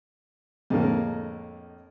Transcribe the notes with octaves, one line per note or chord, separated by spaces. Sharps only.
F2 A2 D3 G#3 A#3